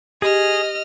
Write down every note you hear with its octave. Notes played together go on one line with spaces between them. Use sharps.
G4 G#4 D#5 F6